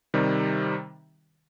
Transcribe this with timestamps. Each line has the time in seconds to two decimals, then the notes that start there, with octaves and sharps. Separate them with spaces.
0.14 C3 D#3 G3